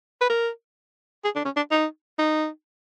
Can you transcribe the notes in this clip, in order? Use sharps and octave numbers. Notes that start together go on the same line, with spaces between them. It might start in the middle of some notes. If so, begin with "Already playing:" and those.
B4
A#4
G#4
D4
C#4
D4
D#4
D#4